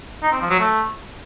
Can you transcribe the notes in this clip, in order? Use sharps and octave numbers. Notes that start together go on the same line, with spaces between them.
D#4
C4
F3
F#3
A3